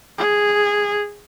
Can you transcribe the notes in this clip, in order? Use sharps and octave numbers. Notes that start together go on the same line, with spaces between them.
G#4